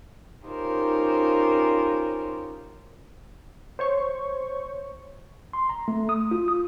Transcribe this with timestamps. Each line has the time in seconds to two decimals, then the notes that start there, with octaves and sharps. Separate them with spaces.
0.46 C#4 D#4 F4 G4 A#4 C5
3.79 C5 C#5 C#6
5.53 C6
5.69 A#5
5.88 A3
6.09 D#6
6.31 F4
6.48 D#6